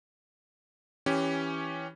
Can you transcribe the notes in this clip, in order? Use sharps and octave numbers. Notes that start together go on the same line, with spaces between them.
E3 C#4 G4